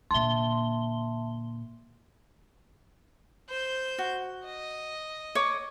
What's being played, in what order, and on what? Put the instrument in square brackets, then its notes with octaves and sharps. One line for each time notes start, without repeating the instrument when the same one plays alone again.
[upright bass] A#2 D3 [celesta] E5 A5 [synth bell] C6 G7
[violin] C5 G6
[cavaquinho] F#4
[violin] D#5
[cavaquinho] C#5 D6